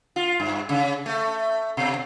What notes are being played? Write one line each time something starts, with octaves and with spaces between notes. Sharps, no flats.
F4
G2
C#3
A3
B2